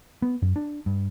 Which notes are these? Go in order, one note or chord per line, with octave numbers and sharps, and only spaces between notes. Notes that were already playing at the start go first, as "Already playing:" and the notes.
B3
F#2
D4
G2